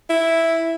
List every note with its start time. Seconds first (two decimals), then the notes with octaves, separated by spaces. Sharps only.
0.09 E4